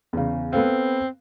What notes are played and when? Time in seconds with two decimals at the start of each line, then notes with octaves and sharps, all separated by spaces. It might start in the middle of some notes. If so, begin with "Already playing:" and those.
0.13 E2 C#3
0.53 B3 C4 A4 F5